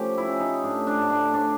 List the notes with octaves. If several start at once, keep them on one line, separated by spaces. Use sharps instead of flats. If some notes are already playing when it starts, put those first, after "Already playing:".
Already playing: F3 A3 C#4 G4
E4
C#4
D#4
A2 D4
D4
A2
D4
A3 D4